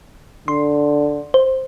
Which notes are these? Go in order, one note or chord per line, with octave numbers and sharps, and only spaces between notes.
D3 C6
C5